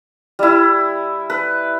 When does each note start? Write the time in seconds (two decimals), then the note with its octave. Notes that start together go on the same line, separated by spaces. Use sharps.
0.39 G3 E4
1.30 B4